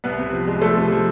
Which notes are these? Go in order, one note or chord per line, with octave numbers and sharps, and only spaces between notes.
C2 B3 B4
C3
F3
G#3
F3 A3 A4
C3
F3